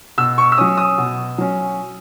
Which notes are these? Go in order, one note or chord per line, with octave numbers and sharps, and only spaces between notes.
B2 E6
C#6
E6
F#3 C#4 D#6
D#6
B2
F#3 C#4